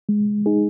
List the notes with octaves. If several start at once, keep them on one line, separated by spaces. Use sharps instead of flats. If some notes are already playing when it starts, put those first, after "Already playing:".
G#3
D#4 G#4